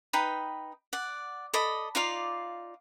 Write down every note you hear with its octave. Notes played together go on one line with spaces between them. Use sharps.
D#4 B4 G5 B5
D5 F#5
A4 D5 D#5 B5
D#4 F4 D5 F5